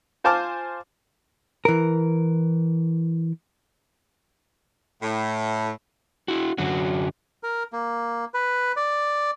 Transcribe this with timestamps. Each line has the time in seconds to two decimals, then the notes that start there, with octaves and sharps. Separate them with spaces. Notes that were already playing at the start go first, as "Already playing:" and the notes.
0.24 F4 C5 G#5 A5 D6 F6
1.65 E3 A#4
5.03 A2
6.28 E4 F#4
6.58 F#2 D3 F#3 F#4
7.43 A#4
7.73 A#3
8.34 B4
8.77 D5